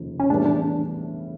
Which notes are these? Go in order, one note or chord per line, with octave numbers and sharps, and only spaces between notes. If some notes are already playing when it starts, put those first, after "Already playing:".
Already playing: F1 D#2 C#3 F3
C#4
A#1 A2 E3 G3 B3 D4
D4